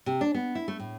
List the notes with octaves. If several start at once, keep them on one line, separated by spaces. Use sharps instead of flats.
C3
D4
B3
E4
A3
A2